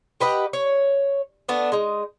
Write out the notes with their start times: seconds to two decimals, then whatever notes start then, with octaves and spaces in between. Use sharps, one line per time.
0.20 G4 B4 D#5 F#5
0.53 C#5
1.49 A3 B3 D4
1.72 G#3 D#4